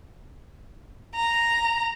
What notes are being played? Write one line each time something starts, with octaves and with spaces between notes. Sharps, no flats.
A#5